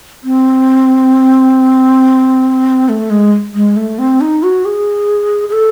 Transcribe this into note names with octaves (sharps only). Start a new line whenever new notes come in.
C4
A3
G#3
G#3
A3
C4
D#4
F#4
G#4
G#4
A4